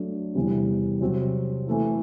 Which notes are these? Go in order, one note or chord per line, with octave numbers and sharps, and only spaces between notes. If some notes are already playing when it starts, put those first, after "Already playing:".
Already playing: F#3 A3 D4
E2 C3 E3 G3
C3 F#3 C4 F#4
E3 A3 E4